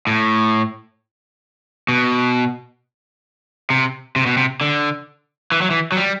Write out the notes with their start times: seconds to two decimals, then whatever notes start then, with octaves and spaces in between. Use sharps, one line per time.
0.07 A2
1.88 B2
3.70 C3
4.16 C3
4.26 B2
4.37 C3
4.61 D3
5.52 E3
5.61 F#3
5.71 E3
5.92 F#3
5.97 G3